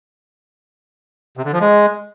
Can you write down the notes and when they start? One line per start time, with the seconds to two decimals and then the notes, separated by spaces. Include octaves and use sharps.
1.37 C3
1.45 D3
1.53 F3
1.60 G#3